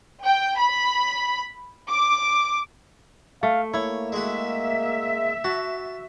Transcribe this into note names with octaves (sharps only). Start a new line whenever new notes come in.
G5
B5
D6
A3 F5
A#3 E4 C#5
G#3 F#4 E5
F#4 A5